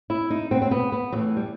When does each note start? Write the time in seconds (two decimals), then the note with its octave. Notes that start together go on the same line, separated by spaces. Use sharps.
0.10 E4
0.30 D#4
0.51 B2 C4
0.62 C4
0.71 B3
0.92 B3
1.12 A2 E3 F#3
1.37 G3